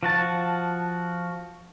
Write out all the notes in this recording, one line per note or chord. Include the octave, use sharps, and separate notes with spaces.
F3 F#4 A5